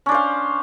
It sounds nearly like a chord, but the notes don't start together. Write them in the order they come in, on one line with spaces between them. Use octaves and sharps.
C#4 D4 C5 F5